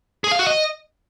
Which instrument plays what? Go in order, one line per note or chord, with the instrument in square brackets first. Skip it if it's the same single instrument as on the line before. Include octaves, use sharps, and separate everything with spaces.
[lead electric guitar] G#4
F5
F#4
D#5